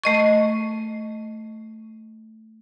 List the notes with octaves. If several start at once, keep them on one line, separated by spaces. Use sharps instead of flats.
A3 D#5 C#6